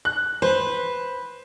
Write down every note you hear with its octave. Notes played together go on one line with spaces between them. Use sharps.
F#6
B4 C5